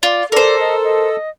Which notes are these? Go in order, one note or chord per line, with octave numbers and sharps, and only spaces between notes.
F4 D5
A4 A#4 C5 D5
D#5
D#5